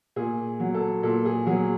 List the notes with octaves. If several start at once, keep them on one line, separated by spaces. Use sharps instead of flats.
A#2 G#4
F#3
A4
A#2 A4
G#4
F#3 G#4